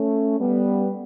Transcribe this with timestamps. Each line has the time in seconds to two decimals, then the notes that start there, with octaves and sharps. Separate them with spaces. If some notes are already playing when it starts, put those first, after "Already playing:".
Already playing: A3 C#4
0.39 G3 B3